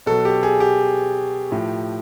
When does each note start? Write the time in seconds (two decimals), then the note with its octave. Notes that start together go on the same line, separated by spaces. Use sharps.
0.06 B2 F#3 A4
0.25 G4
0.43 G#4
0.60 G4
1.51 A2 F3